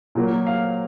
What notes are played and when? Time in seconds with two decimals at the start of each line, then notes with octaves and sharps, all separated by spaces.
0.15 A#2 F#3 A#3
0.47 F5